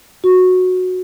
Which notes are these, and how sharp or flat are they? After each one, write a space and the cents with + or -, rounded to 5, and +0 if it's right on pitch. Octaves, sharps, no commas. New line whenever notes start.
F#4 -10